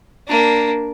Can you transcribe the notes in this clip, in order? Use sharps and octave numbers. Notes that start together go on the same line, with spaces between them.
A#3 D4